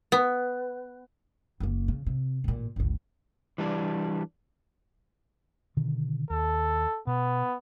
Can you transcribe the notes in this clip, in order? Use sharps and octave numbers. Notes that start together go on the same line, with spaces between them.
B3
F#1 A#3
C#3
C3
A1 A#2
G1 C#2
E3 G3 D4
B2 D3 D#3
D#2 A4
B2 B3